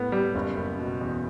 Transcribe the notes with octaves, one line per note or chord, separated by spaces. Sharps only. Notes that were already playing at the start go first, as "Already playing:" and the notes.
Already playing: A2 B3
G3
F#1
F#1
B2
E2